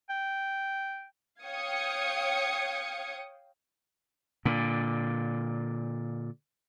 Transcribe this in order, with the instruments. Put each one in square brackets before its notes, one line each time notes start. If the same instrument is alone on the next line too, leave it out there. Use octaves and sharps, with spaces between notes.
[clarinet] G5
[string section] C#5 F5 G5 D#6 G#6 C#7
[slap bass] A#2 D3